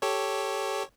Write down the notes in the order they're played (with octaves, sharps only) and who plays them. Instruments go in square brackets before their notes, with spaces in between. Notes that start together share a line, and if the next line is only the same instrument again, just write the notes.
[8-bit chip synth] G4 A4 C#5